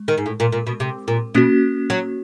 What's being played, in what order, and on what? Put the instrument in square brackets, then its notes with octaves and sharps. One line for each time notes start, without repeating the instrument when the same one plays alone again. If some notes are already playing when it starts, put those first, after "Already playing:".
Already playing: [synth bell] G#3
[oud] D#3
G#2
A2
A#2
A#2
B2
C3
A#2
[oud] B2 [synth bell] A#3 C#4 F#4
[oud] F#3